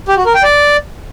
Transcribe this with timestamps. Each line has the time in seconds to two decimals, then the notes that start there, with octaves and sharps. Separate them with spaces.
0.08 G4
0.17 F#4
0.26 A#4
0.34 G5
0.43 D5